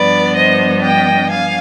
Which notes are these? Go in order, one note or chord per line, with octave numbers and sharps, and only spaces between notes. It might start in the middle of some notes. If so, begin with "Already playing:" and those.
Already playing: G2 F3 B3 D4 B4 D5
C5 D#5
D#5 G5
F5 G#5